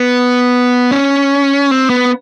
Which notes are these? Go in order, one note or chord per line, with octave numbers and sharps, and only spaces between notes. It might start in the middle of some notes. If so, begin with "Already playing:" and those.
Already playing: B3
C#4
C4
B3